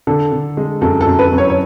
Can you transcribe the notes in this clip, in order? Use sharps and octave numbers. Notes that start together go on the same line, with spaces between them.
D3 A4
D3
G#3
F#2 A4
A4
F#2
B4
F#2
C#5
C#5